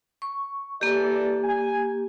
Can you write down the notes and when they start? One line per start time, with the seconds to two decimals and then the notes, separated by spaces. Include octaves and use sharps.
0.22 C#6
0.81 E3 A#3 G4 A4 D5
1.43 G#5